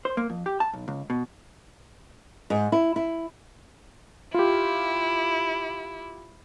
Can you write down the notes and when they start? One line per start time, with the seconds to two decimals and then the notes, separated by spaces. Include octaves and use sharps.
0.05 C5
0.17 A#3
0.30 F2
0.46 G4
0.60 A5
0.73 B1
0.88 C#2
1.10 B2
2.50 G#2
2.72 E4
2.96 E4
4.34 E4 F4 G4